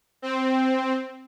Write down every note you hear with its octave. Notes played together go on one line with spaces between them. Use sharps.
C4